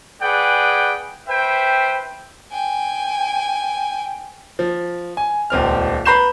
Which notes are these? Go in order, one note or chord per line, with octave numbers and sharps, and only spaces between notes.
G#4 B4 D5 F#5 G5
B4 C5 E5 G5
G5 G#5
F3
G#5
D#1 C#2 C4 F6
B4 A#5 B5 G6 C7 E7